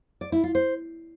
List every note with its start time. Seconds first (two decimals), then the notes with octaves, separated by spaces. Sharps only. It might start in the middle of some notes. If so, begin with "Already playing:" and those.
0.21 D5
0.32 E4
0.44 F4
0.55 C5